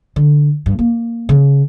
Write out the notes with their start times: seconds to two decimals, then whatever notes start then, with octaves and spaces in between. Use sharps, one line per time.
0.16 D3
0.66 G2
0.79 A#3
1.29 C#3